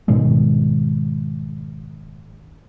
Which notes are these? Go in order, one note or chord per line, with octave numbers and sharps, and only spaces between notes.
G#2 B2 D#3 G#3